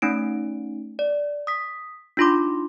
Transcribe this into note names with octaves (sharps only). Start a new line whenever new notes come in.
A3 C#4 D#4 D7
D5
D#6 B6
D4 D#4 F4 B5 C6 D6